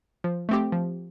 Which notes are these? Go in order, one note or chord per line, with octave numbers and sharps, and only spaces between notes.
F3
A3 C4 G4
F3